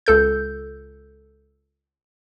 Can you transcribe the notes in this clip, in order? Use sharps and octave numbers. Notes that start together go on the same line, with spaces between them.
C#2 A4 G6